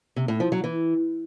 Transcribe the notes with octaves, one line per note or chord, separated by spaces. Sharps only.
C3
A2
F3
F#3
E3